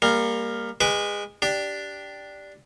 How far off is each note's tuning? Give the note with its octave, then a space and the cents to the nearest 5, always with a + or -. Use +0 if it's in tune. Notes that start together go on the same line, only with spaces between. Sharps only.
G3 +30 A#3 +0
G#3 -25 B4 +0 D6 -25
D4 +0 G4 +0